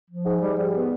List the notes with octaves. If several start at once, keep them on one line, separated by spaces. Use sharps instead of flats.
F3
G#2
G3
G3
B3